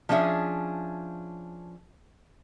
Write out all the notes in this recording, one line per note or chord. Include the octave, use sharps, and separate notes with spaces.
F3 C#4 D4 G#4 E5